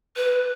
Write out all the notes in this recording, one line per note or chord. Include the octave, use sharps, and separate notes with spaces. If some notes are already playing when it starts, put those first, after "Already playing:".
B4